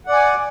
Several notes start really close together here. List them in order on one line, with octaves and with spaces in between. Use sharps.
F#5 D5 G#5